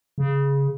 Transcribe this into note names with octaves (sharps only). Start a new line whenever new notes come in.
C#3